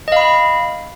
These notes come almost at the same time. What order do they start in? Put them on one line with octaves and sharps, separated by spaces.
D#5 F5 B5